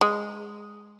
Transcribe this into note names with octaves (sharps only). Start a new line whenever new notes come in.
G#3